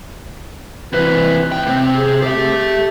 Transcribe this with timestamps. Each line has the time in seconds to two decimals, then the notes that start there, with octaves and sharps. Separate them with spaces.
0.93 C3 E3 B4
1.52 A2 G5
1.67 C3 C4
1.95 G#4
2.22 G4 A4 E5